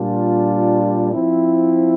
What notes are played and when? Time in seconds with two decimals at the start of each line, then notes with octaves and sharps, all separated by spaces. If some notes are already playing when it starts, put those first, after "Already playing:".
Already playing: A#2 G3 D4 F4
1.12 F3 C4 E4